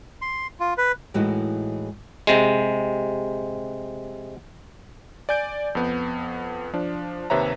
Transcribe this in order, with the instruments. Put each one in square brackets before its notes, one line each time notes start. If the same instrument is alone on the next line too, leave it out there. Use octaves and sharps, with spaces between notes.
[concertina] C6
F4
B4
[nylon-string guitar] A2 E3 G#3 D#4 E4 F#4
[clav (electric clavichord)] C3 G#3
[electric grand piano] D5 G#5 G6 D7
F2 B3
F3 D4
D#2 C3 B4 C#5 E5 A#5